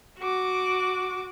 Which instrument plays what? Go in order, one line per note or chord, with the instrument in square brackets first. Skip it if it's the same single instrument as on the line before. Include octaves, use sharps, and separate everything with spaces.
[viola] F#4 D6